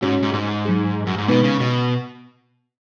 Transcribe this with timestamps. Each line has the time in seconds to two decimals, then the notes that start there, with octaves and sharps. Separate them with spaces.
0.02 G#2 C#4 F#4 C#5
0.23 G#2
0.33 G#2
0.65 F#3 D#4 G#4
1.07 F#2
1.18 G#2
1.28 B2 G#3 B3 D#4 B4
1.44 C#3
1.60 B2